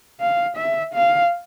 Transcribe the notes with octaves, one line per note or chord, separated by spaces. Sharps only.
F5
E5
F5